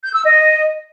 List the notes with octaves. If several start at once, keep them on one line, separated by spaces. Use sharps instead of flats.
G6
E6
D#5